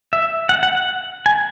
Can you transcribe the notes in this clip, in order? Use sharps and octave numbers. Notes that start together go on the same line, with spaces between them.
E5
F#5
F#5
F#5
G#5